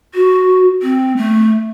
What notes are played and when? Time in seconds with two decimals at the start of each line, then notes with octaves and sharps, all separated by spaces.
0.14 F#4
0.82 C4
1.17 A3